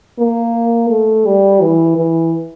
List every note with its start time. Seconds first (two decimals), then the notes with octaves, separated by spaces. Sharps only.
0.19 A#3
0.90 A3
1.26 G3
1.62 E3
1.97 E3